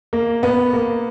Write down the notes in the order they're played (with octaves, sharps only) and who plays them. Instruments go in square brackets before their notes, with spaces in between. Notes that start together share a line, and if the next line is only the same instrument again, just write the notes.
[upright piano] A#3
B3
A#3